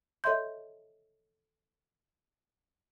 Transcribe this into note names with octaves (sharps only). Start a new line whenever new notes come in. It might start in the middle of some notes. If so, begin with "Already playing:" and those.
A4 C#5 D#5 E5 C6 G6